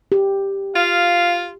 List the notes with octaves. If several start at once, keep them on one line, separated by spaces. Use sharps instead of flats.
G4
F4 F5